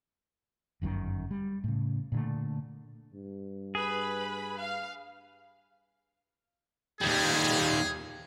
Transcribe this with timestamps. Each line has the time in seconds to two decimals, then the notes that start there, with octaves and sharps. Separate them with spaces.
0.82 G1 F#2 A2 D#3
1.31 G3
1.64 A2 C#3
2.12 A#2 D3 A3
3.14 G2
3.75 G#4 B4 B5
4.59 F5
7.01 D#2 G3 G#4